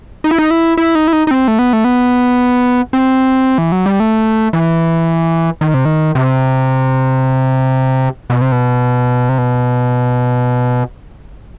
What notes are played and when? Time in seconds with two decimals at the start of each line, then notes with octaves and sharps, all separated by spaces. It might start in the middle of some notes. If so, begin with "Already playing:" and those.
0.24 D#4
0.31 E4
0.38 D#4
0.51 E4
0.78 E4
0.95 D#4
1.08 E4
1.13 D#4
1.27 D#4
1.31 C4
1.48 A3
1.59 B3
1.73 A3
1.84 B3
2.93 C4
3.58 E3
3.72 F#3
3.86 G3
4.00 A3
4.53 E3
5.61 D#3
5.74 C3
5.85 D#3
6.15 C3
8.30 B2
8.41 C3
8.52 B2
9.29 C3
9.38 B2